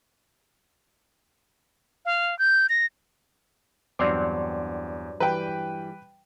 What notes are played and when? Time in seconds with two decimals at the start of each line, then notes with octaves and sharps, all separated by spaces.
2.05 F5
2.39 G6
2.69 A#6
3.99 E2 G2 F#3 C4 D5 C6 D6
5.20 E3 G3 B4 G5